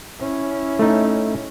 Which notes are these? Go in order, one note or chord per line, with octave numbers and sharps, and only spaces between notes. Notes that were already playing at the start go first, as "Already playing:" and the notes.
C#4 E4
A3 D#4